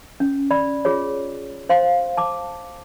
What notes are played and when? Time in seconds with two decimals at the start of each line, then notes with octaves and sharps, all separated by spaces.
0.20 C#4
0.51 D5 B5
0.85 F4 G#4 C#5
1.69 C5 F5 C6
2.17 A5 D6